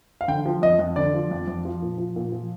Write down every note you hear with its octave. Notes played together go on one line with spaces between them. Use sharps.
F5
D3 G5
F3
F2 D#5
F2
D3 D5
F3
F2
F2
F3
A#2
F3
A#2
F3